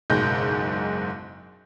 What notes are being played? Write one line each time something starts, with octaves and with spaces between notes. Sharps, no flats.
F#1 B1 G#2 G6